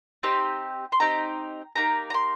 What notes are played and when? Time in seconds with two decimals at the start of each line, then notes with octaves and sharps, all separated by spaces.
0.23 C4 D#4 G4
0.92 C6
1.00 C4 D#4 G4 A#5
1.75 A#3 D#4 G4 A#5
2.10 A#5
2.14 C6